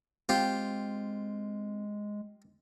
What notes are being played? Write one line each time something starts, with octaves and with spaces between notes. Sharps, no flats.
G#3 C4 F4 G4